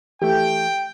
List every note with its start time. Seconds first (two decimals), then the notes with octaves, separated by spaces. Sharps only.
0.22 E3 A3 G4 G5